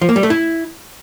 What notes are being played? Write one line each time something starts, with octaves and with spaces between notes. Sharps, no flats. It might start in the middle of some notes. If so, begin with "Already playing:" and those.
F3
A#3
G3
A3
E4